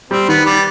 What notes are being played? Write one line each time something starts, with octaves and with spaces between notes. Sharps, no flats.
G3 C4
D#3 B3
G3